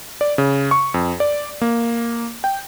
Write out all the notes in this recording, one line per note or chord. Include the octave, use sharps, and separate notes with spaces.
D5
C#3
C#6
F2
D5
A#3
G5